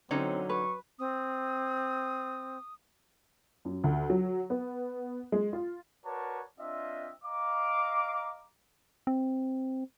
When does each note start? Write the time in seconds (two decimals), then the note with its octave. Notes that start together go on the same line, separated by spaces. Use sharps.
0.11 D3 F#3 C4 C#4 D#4 C#5
0.49 B4 C#6
0.99 C4 D#6
3.65 F#2
3.84 D2
4.10 F#3
4.50 B3
5.32 G#3
5.53 F4
6.06 F#4 A#4 B4 C#5 D5 A5
6.59 C4 D4 F4 D#5 E5
7.24 D#5 F5 A#5 D6
9.07 C4